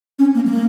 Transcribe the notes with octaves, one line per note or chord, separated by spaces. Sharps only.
C#4
A#3
G#3
A#3